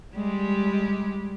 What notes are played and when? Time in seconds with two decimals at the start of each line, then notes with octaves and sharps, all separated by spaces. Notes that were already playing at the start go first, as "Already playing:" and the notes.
0.15 G3 G#3 G4